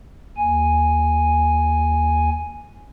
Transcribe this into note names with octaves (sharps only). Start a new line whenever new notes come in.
D#2 G#5